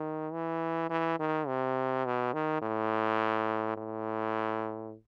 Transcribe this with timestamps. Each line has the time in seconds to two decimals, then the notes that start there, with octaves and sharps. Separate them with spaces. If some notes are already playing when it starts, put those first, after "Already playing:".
Already playing: D#3
0.33 E3
0.90 E3
1.20 D#3
1.48 C3
2.06 B2
2.34 D#3
2.62 A2
3.77 A2